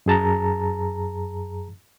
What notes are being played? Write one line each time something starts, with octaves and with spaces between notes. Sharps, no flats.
F#2 G#4 A5 A#5